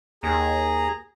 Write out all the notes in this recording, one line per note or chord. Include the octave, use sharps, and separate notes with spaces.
D#2 G#4 A#5